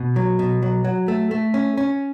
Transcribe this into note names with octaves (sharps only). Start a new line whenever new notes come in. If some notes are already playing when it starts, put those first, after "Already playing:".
Already playing: B2
F#3
B2
F#3
F#3
A3
A3
C#4
C#4